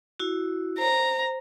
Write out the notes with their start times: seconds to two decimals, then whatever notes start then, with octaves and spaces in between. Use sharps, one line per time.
0.20 E4 F#4
0.78 C5 A#5